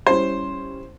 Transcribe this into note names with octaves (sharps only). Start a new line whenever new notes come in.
G3 C#4 E4 C5